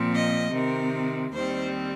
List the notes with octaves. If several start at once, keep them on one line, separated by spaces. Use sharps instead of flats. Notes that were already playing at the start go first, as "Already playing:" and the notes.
Already playing: A#2 F3 C4
D#5
C3 D#3 C4 A#4
D#2 D#3 G3 C4 C5